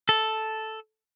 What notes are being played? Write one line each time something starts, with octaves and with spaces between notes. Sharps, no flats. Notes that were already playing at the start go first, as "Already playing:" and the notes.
A4